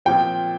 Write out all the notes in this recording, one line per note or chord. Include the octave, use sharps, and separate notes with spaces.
A#2 F3 C4 G5